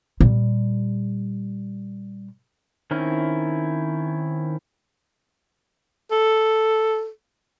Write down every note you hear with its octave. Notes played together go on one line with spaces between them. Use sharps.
A#2 G3
D#3 C4 C#4 E4
A4